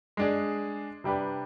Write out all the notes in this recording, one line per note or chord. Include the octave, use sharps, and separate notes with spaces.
G#3 D4 G#4
C3 G3 D4 G4 B4